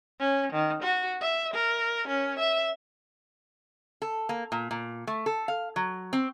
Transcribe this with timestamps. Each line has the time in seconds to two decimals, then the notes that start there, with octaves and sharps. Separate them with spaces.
0.20 C#4
0.53 D#3
0.82 F#4
1.22 E5
1.54 A#4
2.08 C#4
2.39 E5
4.02 A4
4.29 A#3
4.52 A#2
4.71 A#2
5.07 A3
5.26 A4
5.48 F5
5.76 F#3
6.13 C4